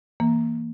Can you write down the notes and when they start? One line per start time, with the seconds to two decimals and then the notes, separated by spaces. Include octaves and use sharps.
0.20 E3 A#3